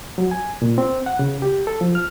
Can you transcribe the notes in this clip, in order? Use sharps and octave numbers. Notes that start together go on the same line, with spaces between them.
F#3
G#5
A#2
C4
F#5
C#3
G4
A4
F3
F6